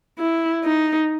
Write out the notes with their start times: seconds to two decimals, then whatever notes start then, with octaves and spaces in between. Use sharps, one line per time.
0.19 E4
0.65 D#4